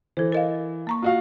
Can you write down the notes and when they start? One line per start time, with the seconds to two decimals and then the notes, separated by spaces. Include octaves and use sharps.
0.17 E3 A4 C5
0.32 A#4 D#5 F5
0.87 A#3 A#5 C#6
1.02 F4 F#4 F5